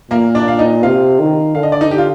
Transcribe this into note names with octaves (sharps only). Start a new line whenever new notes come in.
A#2 A#3 A#4
D4 D5
F5
D#4 D#5
C3 F4 F5
D#3
D3 F5
D#5
D5
D#4 D#5
G4
F4